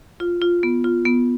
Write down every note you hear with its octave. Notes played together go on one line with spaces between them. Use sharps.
F4
F4
B3
F4
B3